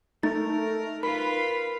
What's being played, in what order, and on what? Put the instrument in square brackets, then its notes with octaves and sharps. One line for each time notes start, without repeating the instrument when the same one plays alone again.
[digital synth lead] A3 [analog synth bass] D#4 [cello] A#4 [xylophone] A6
[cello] F4 B4 [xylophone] A#4 B5 [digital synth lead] B6